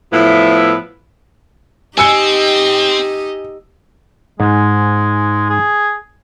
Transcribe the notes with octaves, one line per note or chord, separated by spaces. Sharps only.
A2 F3 B3 E4
C4 D#4 G4 D#5 G#5 E6 C#7
G#2 G#3
G#4